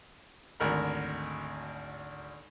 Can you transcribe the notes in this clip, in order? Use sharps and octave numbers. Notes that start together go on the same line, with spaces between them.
G#1 D2 A#4 B5